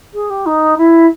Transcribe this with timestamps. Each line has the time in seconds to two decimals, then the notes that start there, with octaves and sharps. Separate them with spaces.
0.14 G#4
0.30 G4
0.46 D#4
0.78 E4